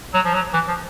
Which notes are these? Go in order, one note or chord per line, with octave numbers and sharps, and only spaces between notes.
F#3
F3
F#3
E3
F3